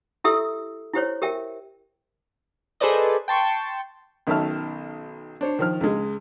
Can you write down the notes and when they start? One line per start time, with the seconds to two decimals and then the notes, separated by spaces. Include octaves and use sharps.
0.24 E4 G4 A4 E5 D#6 E6
0.94 E4 G4 C5 C#5
1.22 G4 A#4 E5 G5
2.80 G#4 A4 B4 C5 D5 D#5
3.28 G5 A5 C6 C#6
4.27 B1 D#3 C#4 E5 A5 F6
5.41 D4 C5 C#5
5.59 D#3 F3 F6
5.81 C#2 G#3